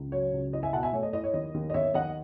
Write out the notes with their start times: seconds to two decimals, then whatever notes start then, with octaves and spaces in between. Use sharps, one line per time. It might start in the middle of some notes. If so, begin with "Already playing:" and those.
Already playing: C#2
0.12 F#3 C#5
0.33 C#2
0.53 E4 D#5
0.63 E5 G#5
0.73 B2 F#5 A5
0.83 E5 G#5
0.93 A3 C#5
1.03 D#5
1.13 E4 D#5
1.24 C#5
1.34 D#2 D#5
1.54 D#2
1.70 D#5
1.74 D#2 C#5 E5
1.94 D#2 D#5 F#5